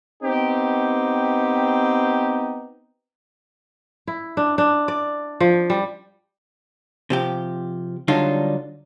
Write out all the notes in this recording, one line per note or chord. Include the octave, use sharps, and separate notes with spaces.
B3 C4 D#4 G4
E4
D4
D4
D5
F3
G3
C3 F3 G4
D3 F#3 G3 D4 D#4 F4